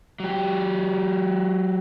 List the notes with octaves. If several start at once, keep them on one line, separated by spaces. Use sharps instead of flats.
F#3 G4